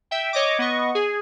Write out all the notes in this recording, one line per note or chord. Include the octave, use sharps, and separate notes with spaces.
E5 G5
C#5 D#5 D6
B3 D#5 C#6
G#4